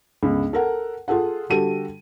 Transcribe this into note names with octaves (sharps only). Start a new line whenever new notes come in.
G1 C#2 C#3
A4 A#4 F#5
F4 G#4 A4 F#5
D3 G3 F#4 G4 A4 D#7